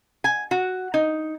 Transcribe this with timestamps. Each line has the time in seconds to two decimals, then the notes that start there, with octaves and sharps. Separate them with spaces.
0.24 G#5
0.51 F#4
0.94 D#4